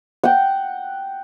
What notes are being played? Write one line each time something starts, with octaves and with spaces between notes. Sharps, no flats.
F#5 G5